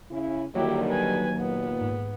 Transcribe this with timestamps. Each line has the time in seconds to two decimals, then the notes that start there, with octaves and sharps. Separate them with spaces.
0.11 C#3 C#4 E4
0.55 D#2 D3 D#3 F#3 G3 E4 G4
0.90 B4 G#5
1.39 A#2 B3
1.81 G#2